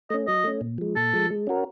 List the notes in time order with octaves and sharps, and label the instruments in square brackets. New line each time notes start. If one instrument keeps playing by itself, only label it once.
[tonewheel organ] A3 C#4 [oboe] D#5
[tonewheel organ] F#3 [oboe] D#5
[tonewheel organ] A3 C#4
A#2
F3 G#3
[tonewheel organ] A#2 [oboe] A4
[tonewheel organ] F3 G#3
G#3
C#4 F#4 A#4